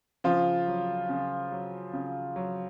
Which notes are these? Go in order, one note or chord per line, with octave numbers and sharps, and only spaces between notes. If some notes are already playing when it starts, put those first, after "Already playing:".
C#3 F3 F4
F#3
C#3
F#3
C#3
F#3